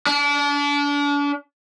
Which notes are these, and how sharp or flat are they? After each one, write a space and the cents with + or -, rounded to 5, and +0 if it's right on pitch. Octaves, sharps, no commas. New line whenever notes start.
D4 -35